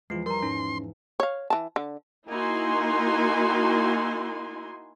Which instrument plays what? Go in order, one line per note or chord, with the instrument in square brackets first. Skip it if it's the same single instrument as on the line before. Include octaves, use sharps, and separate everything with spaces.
[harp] E2 E3 F3 [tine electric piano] G#3 F4 [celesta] C7
[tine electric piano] G3 [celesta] A#4 A#5 [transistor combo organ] C6
[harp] G#2 [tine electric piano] C#4 [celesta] D#4
[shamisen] C#5 F5
E3 A5
D3
[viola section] A#3 D#4 E4 F#4 G#5 C6